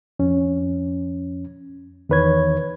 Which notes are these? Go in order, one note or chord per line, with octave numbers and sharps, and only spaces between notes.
F2 C#4
E2 D#3 B4 C#5 G#6